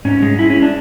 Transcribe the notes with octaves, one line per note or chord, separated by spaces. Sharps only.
G#2 C#4
G#3
G#3 E4
C#4
D4